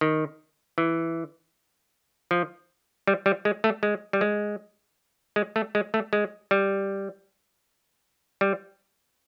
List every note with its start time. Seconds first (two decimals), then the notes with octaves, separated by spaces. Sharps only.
0.01 D#3
0.78 E3
2.31 F3
3.07 G3
3.26 G3
3.45 G#3
3.64 A3
3.83 G#3
4.13 G3
4.21 G#3
5.36 G#3
5.56 A3
5.75 G#3
5.94 A3
6.13 G#3
6.51 G3
8.41 G3